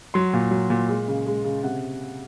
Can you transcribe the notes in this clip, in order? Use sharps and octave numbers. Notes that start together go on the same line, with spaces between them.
F#3 C6
A#2
F#3
A#2
G#3
C#3
G#3
C#3
C3 F#5